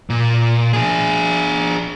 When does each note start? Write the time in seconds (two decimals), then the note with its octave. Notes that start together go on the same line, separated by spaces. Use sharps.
0.10 A#2
0.73 D4 G#4